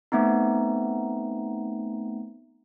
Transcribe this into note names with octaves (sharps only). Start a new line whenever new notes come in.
A3 B3 C4 D#4